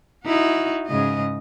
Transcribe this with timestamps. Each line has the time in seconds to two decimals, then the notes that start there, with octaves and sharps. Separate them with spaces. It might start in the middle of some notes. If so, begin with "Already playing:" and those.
0.25 D#4 E4 F#4
0.87 G#2 C#3 D#5